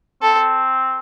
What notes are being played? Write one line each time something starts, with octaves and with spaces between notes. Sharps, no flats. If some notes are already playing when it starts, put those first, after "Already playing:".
C4 A4